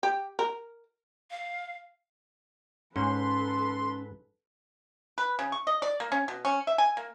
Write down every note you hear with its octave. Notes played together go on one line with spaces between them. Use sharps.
G4
A#4
F5
G#2 C#4 A4 B4 C6
B4
C#3
C#6
D#5
D5
A#3
C#4
B2
C#4
E5
G#5
A#3